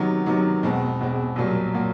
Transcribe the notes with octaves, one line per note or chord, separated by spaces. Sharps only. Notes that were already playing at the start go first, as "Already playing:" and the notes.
Already playing: C3 D#3 F#3 B3
C3 D#3 F#3 B3
E2 B2 G#3 C4
E2 B2 G#3 C4
C2 A#2 F#3 A#3
A#2 F#3 A#3